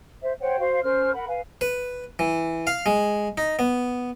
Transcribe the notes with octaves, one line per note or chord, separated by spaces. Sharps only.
C5 E5
C5 C#5 F#5 G5
F#4 C5 F5
C#4 A#4 C5 F6
A#4 F#5 B5
B4 F5 G#5
B4
E3
F5
G#3
D#4
B3